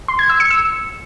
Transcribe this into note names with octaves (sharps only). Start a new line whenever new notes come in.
C6
G#6
E6
C#7
E6